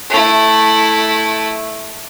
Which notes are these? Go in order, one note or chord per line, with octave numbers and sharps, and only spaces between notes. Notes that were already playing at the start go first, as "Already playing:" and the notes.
A3 E4